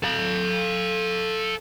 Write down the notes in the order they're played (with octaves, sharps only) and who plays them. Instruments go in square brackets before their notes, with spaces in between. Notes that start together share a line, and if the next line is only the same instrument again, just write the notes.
[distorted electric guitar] A4 F5